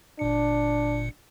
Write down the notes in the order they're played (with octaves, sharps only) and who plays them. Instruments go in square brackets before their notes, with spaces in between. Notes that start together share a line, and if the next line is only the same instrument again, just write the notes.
[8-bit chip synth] G1 A#2 C#7 [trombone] D4